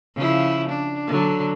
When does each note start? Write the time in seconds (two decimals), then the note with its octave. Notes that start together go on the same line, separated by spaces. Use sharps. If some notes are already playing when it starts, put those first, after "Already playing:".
0.15 C#3 F3 E4
0.69 D4
1.07 D3 F#3